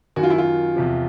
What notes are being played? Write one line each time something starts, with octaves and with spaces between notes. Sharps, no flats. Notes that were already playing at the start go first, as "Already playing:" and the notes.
F#2 D#3 F#4
F4
E4
F4
E2 C3 F3